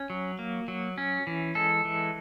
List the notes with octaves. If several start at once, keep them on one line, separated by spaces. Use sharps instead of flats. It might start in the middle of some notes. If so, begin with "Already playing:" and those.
Already playing: C#4
F#3
A#3
F#3
C#4
E3
G#3 A4
E3